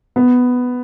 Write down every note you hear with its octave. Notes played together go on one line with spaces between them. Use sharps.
B3